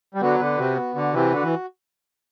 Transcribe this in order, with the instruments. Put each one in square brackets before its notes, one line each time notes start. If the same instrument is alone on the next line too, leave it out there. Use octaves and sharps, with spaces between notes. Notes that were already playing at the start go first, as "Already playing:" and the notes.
[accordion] G3
[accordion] D3 F#3 [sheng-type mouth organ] B3
[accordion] D3 [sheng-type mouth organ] B4
[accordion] C3 [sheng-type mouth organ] F#4
[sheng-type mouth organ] B3
[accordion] D3 [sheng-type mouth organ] F#4
[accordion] C3 E3 [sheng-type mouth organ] B4
[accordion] D3 [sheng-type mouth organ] F#4
[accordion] E3